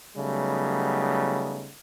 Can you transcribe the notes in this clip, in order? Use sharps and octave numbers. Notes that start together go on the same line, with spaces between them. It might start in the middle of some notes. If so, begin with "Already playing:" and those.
C#3 F#3 G3 A3 B3 D#4